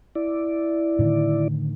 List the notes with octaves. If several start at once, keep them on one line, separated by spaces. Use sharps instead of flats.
E4 D5
A2 D3 D#3